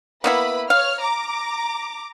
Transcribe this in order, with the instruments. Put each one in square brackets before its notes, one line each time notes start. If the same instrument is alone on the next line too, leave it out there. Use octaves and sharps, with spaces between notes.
[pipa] A#3 B3 E4 [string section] B4 B5
[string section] C#5 F6 [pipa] F5
[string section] A#5 D6